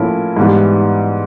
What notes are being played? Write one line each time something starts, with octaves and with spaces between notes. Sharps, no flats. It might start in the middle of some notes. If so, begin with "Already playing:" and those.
Already playing: A2 F3 A#3 C#4 E4
G#2 E3 G3 B3